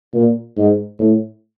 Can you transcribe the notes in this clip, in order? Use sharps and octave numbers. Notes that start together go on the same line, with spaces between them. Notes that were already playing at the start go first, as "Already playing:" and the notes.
A#2
G#2
A2